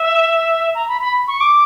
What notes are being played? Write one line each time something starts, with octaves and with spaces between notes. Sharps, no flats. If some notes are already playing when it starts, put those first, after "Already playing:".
Already playing: E5
A#5
B5
B5
C#6
D6